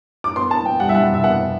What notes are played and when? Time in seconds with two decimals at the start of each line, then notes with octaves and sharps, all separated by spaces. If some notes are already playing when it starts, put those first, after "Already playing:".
0.24 D6
0.36 B3 C6
0.50 B3 A5
0.65 B3 G5
0.80 G3 F#5
0.89 E5
0.95 G3 F#5
1.09 C3 E5
1.24 B3 F#5
1.39 B3